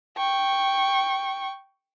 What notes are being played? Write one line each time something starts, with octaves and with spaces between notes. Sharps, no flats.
G5 C#6